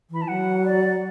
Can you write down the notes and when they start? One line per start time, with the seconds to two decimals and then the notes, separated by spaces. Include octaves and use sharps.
0.10 E3 B5
0.22 A5
0.28 F#3 F#5
0.65 D5